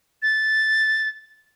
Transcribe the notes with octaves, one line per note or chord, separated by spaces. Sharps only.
A6